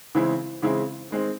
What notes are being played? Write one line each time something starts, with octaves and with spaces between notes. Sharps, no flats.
C#3 E3 G#3 C4 E4
C#3 E3 G#3 C4 E4
D#3 G#3 C4